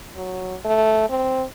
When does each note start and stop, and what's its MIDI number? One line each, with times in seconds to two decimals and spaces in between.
0.16 0.55 54
0.65 1.05 57
1.10 1.44 60